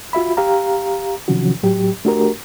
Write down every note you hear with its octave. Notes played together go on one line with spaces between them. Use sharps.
F4 F#4 E5 B5
G4 F5 A#5
C3 D#3 F3 F#3 C#4 F#4
A2 F#3 G4
A3 D4 F#4 G4 A#4